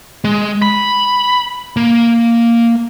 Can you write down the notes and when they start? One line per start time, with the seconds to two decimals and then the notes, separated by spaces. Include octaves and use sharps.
0.24 G#3
0.62 B5
1.77 A#3